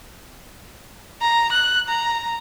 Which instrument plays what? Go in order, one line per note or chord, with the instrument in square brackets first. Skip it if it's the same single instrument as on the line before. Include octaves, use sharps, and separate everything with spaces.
[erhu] A#5
F#6
A#5